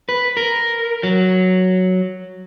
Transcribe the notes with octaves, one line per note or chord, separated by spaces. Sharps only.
B4
A#4
F#3